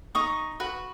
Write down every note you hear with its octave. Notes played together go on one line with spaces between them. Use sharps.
D#4 C#6 D#6
F#4 B4